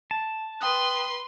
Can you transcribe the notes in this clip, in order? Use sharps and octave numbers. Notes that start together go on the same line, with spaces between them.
A5
B4 G5 C6 D#6 F#6